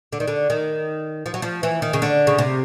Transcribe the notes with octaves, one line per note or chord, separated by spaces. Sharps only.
D3
D#3
D3
D#3
F3
F#3
F3
E3
D#3
C#3
D3
C#3
C3